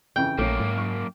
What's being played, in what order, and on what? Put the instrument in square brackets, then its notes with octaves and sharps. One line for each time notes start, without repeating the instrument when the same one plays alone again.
[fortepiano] F2 C#3 E3 [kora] G5
[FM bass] A#1 [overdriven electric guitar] F#2 A#3 [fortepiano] A3 C#4
[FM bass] G#2
[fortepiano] C#6 F6